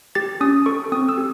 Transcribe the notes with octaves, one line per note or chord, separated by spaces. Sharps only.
G4 A6
C#4 D#6
A4 C#6
C4 D#6
E6
G4